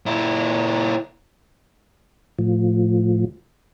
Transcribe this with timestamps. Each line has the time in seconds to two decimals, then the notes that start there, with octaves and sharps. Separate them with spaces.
0.06 A#2 E4
2.39 A2 F3